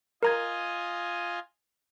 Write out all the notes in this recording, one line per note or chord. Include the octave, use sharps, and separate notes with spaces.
F4 A#4 D#5 G#5 A#5 G#6